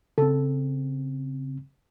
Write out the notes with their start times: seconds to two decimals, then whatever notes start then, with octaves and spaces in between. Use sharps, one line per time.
0.18 C#3 C4 A4